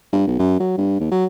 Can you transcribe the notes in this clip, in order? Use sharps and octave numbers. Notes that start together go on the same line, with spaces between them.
G2
B1
F#2
F#3
G2
D#2
F#3